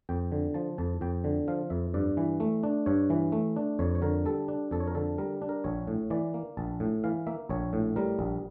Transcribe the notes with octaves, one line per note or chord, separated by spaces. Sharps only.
F2 G5
D3
F3 A5
F2 A5
F2 G5
D3
F3 F5
F2 E5
G2 D5
E3
A3
D4
G2 C#5
E3
A3
D4
F2 C#5
C#5
D3 A#4
G3 A4
D4
F2 A4
C#5
A#4
D3 A4
G3 A#4
D4
A#4
A#1 C#5
A2
E3 D5
A#3
A#1 A5
A2
E3 F5
A#3 E5
A#1 C#5
A2
G3 A#4
A#1